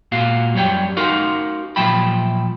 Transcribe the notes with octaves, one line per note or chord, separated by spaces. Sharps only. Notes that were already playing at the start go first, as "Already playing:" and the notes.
A#2 F#4 F5
F#2 F#3 G3 C#5 G5
D#4 F#4 A#4 F5 C6
A#2 F3 F#3 E5 G5 B5